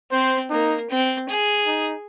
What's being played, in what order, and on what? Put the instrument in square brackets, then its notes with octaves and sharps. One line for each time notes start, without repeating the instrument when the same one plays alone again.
[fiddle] C4 [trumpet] C5
[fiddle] A#3 [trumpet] D#4
[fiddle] C4
G#4
[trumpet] D#4